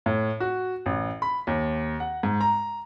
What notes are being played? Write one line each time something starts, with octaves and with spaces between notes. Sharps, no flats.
A2
F#4
A1
B5
D#2
F#5
G#2
A#5